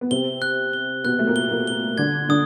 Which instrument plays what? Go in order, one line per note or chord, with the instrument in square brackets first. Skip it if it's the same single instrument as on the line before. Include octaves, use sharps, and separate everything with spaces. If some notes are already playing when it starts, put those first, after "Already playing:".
[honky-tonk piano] B3
[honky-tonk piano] C3 C4 [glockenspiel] G7
[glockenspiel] F#6
G7
[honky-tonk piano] B2 B3 [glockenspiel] F#6
[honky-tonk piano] A3
A#2 A#3
[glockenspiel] G7
[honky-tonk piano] A#2 A#3
[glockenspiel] G7
[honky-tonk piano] D3 D4 [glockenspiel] G#6
[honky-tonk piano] D3 D4 [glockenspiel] D#6